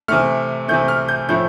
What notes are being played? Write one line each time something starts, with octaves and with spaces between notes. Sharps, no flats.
C3 E3 A3 F6
C3 E3 A3 G6
F6
G6
A2 F3 A3 G6